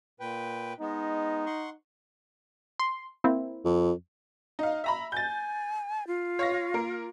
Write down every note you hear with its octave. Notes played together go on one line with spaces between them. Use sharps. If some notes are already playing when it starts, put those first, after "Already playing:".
A#2 B4 G5
G#3 B3 D#4
F#5 C6 C#6
C6
A#3 C4 E4
F2
D#4 F5
E5 A#5 B5
G#5 G6 A6
F4
C#5 F5 A#6
A#3 A#4